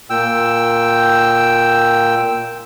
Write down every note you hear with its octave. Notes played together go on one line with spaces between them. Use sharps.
A#2 G5 E6